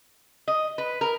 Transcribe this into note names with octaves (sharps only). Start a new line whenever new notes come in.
D#5
B4
A#4